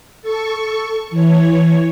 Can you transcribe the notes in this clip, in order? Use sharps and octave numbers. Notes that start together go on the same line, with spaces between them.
A4 C#6
E3 C#5